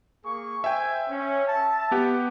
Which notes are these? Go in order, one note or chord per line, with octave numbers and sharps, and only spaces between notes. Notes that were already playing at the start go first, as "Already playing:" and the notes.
A#3 G#4 C#6
C5 E5 G5 G#5
C#4
E5 A5
B3 G4 F#5